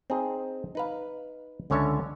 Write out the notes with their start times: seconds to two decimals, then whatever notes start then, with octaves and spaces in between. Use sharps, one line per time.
0.10 C4 D#4 G#4
0.75 D#4 B4 F5
1.70 C#2 D3 C#4 C#5 E5 A5